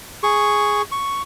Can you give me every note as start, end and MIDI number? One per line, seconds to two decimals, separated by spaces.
0.23 0.82 68
0.23 0.82 85
0.92 1.22 85